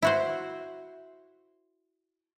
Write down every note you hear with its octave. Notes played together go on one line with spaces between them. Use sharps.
E4 F#4 C5